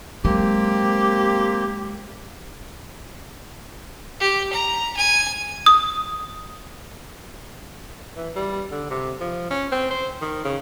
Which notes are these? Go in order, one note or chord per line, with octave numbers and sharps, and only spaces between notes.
F#3 G#3 A#3 C4 G4
G4
A#5
G#5
D#6
E3
G3
D3
C3
F3
C#4
C4
C5
D#3
C#3